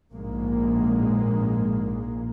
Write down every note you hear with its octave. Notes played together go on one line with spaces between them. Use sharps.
A#1 G#2 G#3 A#3